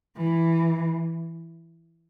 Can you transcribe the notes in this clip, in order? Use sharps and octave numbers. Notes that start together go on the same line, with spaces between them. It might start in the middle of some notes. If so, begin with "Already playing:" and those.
E3